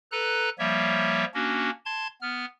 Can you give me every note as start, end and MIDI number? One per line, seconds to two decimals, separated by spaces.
0.12 0.50 69
0.12 0.50 71
0.12 0.50 82
0.12 0.50 90
0.59 1.25 53
0.59 1.25 55
0.59 1.25 58
0.59 1.25 73
0.59 1.25 76
1.34 1.70 58
1.34 1.70 61
1.34 1.70 62
1.34 1.70 66
1.86 2.07 81
1.86 2.07 84
1.86 2.07 92
2.22 2.45 59
2.22 2.45 89